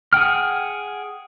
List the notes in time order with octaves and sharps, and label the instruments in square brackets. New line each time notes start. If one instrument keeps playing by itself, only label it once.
[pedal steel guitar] G#4 F#5 G5 F6